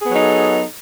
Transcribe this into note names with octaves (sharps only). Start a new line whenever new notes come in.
F#3 B3 D#4 G#4 A4